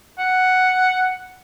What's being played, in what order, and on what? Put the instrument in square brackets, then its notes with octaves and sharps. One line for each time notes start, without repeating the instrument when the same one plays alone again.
[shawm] F#5